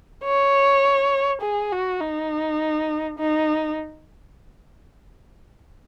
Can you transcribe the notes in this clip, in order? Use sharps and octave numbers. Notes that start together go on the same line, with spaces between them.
C#5
G#4
F#4
D#4
D#4